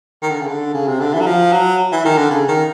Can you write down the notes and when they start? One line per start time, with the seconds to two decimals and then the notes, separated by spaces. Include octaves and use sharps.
0.23 D#3
0.31 D3
0.39 C#3
0.48 D3
0.74 C#3
0.88 C3
1.00 D3
1.14 E3
1.20 F#3
1.26 F3
1.52 F#3
1.92 E3
2.05 D#3
2.18 D3
2.31 C#3
2.48 D#3